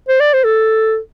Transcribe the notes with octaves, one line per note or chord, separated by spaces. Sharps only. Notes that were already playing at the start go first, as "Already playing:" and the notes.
C5
D5
C5
A4